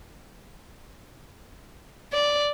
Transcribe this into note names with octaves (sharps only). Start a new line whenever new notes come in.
D5